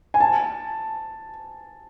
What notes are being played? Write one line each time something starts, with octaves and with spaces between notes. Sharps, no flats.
G#5
A5